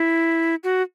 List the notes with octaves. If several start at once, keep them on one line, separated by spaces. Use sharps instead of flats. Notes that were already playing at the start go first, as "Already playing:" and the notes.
Already playing: E4
F#4